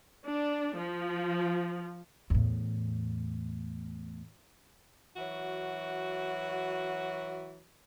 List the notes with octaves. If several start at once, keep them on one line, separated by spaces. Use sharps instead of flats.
D4
F3
E2 A2
E3 F#3 F#4